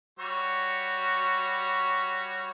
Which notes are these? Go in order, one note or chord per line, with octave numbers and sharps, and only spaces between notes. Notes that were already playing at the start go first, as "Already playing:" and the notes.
G3 F#4 C#5